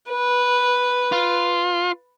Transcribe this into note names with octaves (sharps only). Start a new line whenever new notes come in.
B4
F4